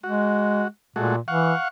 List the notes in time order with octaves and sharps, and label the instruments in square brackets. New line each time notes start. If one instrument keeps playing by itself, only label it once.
[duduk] G#3 [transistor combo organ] F#4
[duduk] A#2 [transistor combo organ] G#3 A3 F#4
[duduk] E3 [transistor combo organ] F5 F#5 C#6